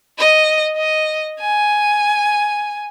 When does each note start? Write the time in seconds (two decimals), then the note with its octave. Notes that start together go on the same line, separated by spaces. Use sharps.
0.18 D#5
0.77 D#5
1.40 G#5